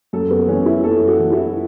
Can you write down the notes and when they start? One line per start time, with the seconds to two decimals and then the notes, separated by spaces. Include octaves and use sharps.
0.13 F#2 A4
0.31 B3
0.48 E3 C#4
0.66 E4
0.84 F#2 A4
1.07 F#4
1.19 E3
1.32 E4